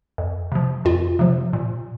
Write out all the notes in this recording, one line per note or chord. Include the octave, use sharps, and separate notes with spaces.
F2
C3 F3
F2 F4
C3 F3
A#2